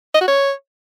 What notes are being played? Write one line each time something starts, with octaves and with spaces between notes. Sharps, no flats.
D#5
F#4
C#5